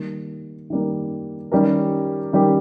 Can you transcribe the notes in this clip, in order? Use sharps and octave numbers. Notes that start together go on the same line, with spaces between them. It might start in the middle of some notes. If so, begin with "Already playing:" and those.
Already playing: D#3 G3 A#3
D#3 G3 A#3
D#3 G3 C#4 G4 A#4
D#3 G3 C#4 G4 A#4